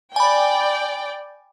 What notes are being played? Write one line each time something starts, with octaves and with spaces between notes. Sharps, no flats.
D5 G5 G#5 B5